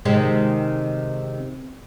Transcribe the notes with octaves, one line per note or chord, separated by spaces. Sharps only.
C3 D#3 G#3